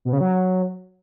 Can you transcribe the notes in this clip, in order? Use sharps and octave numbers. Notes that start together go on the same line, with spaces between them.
B2
C#3
F#3